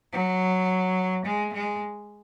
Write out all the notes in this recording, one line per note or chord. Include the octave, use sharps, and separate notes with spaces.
F#3
G#3
G#3